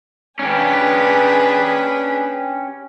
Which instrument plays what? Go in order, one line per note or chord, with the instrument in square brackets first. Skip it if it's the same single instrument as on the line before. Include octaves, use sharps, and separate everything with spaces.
[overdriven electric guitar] C#4 G4 [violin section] D4 G#4 B4